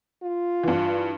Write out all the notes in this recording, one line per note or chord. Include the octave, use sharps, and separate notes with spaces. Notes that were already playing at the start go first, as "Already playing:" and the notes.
F4
G2 E3